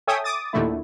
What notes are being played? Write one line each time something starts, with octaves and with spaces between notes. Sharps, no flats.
A4 C#5 E5 G5 G#5 D#6
D6 D#6 A6
D#2 A#2 D3 A3 E4